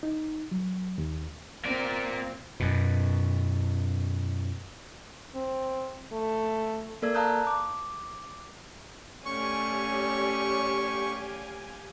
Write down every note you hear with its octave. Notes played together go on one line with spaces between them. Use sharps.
D#4
F#3
D#2
A#2 A#3 C4 D5
F#2 B2
C4
A3
A#3 A4 A#4 D5 E6 G#6
F5 A5 A#5 D#6 F#6 G6
D6
A3 C#4 G4 C#5 D5 F5 G#5 C#6